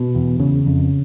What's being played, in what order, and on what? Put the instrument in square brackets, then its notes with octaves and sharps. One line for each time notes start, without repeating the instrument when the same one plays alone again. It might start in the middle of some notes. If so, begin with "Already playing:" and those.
Already playing: [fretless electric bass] B2
E2
C#3
F2